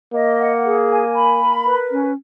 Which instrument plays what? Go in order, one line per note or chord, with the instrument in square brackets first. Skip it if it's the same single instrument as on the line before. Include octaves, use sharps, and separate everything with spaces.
[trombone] A#3 [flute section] D#5
[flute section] F#5
G#4
G#5
B5
A#4
B4
C#4